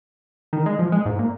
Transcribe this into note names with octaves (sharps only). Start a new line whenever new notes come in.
D#3
G#3
F3
G#3
G#2
A#2